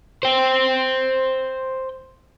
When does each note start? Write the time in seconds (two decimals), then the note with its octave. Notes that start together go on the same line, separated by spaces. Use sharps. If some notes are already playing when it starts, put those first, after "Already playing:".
0.23 C5 G5